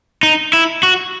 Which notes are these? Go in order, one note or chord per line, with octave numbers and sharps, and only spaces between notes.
D#4
E4
F#4